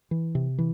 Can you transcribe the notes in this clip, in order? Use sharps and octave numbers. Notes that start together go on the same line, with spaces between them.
E3
C3
E3